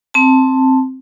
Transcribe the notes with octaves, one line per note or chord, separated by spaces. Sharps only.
C4 A5